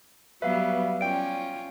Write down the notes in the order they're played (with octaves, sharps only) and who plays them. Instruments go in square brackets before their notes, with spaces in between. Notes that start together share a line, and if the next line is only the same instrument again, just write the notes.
[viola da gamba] F#3 G3 B3 [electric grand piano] B4 [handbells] E5 F5
[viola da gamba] C#4 F4 [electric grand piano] D5 G5 [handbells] D7